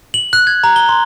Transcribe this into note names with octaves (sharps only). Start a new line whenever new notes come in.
F#7
F#6
G#6
A#5
G7
C6